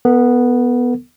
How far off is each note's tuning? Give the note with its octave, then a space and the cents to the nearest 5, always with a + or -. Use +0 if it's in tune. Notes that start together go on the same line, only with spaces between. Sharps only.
B3 -5 A4 +40